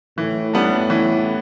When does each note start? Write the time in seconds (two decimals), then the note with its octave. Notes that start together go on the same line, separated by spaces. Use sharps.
0.17 A2 E3
0.54 G3 B3 D4
0.90 E3